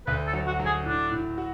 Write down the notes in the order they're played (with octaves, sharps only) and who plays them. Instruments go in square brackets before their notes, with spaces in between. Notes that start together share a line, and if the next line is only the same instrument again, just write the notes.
[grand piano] D2 [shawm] B4
[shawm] A4
[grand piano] F#3
[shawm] F#4
[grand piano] F#3
[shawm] G#4
[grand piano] A2 [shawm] D4
[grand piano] A2
F#4